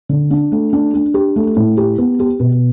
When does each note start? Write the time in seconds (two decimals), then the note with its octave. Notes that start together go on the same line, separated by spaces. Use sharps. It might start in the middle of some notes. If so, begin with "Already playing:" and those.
0.09 D3
0.31 D4
0.52 A3
0.73 D4
0.94 D4
1.14 G4
1.36 A3
1.56 A2
1.77 G4
1.98 B3
2.20 G4
2.40 B2